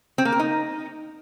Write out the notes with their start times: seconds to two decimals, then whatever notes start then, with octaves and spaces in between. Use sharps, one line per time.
0.18 C4
0.25 A#3
0.32 A#4
0.40 D#4